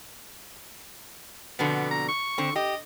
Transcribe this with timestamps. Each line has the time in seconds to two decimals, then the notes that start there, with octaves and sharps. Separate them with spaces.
1.59 F2 B2 D3 B3
1.91 A#5
2.08 C#6
2.38 D3 C4
2.55 G4 D#5